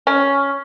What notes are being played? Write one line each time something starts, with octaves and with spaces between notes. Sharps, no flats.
C#4